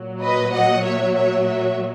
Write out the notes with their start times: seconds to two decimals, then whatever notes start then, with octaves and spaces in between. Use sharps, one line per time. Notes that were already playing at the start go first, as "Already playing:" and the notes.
Already playing: A#2 F#3
0.22 B4 D#5
0.54 D#5 F#5
0.85 C#5 E5
1.16 C#5 E5
1.47 C#5 E5